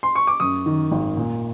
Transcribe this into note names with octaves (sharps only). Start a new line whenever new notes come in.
C6
C#6
D6
F#2 C#6 D#6
D#3
G#1
A#2